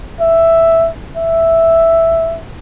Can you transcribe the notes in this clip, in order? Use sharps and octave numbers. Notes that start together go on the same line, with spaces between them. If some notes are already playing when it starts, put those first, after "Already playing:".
E5
E5